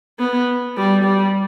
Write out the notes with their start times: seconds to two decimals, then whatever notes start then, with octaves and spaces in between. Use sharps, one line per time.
0.19 B3
0.77 G3
1.04 G3